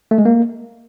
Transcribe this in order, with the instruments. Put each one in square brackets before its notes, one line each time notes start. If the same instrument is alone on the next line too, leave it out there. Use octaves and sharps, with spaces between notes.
[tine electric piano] A3
G#3
A#3